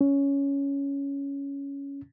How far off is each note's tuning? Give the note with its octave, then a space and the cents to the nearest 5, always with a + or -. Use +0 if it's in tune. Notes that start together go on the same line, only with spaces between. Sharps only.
C#4 +10